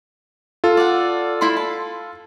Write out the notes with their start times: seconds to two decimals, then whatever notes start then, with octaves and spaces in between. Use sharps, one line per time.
0.64 F4 A4
0.77 D5 F#5
1.41 E4 B5 C6
1.57 A5